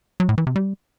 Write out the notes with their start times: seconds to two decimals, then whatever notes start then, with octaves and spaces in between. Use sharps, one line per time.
0.20 F#3
0.29 A2
0.38 E3
0.47 C3
0.56 G3